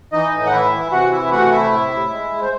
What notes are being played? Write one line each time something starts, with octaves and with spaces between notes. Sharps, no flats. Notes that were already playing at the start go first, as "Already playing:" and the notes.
E3 D#4 D#5
A2
F#5
E3 E4 E5
E3
C3 F#4 F#5
E3 E4 E5
A3 F#4 F#5
C3 E4 E5
A2
A2
G#3
G#3
C5